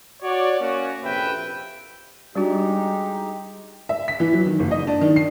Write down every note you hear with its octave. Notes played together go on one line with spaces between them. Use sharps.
F#4 C#5 D5
A#3 C#4 F#4
A#1 F2 C3 B4 E5 G5
G3 G#3 D4 D#4 F#4 G4
E5
B6
E3
F#3
D#3
F#1
D#5
D4
D#3
C7